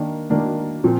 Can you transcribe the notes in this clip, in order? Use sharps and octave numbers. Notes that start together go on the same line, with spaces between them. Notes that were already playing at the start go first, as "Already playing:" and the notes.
Already playing: D#3 A#3 D4
D#3 A#3 D4
A#2 F3 C4